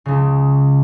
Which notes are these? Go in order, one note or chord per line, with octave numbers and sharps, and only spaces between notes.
C#2 C#3